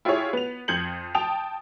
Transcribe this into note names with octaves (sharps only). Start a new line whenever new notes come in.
E4 F4 G4 G#4 C#5
B3 F7
F2 G6 G#6 C#7 F#7
G5 A5 D#6 F7